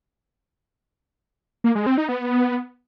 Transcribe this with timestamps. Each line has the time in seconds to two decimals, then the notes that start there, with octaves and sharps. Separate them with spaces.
1.64 A#3
1.75 G#3
1.86 C4
1.98 D#4
2.09 B3